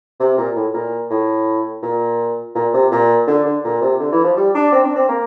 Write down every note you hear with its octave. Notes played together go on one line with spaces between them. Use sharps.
C3
A#2
A2
A#2
A2
A#2
A#2
C3
A#2
D3
D3
A#2
C3
D3
E3
F3
G3
D4
C4
D4
C4
A#3